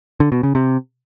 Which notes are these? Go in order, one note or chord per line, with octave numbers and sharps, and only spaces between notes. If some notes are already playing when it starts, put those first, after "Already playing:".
D3
B2
C#3
C3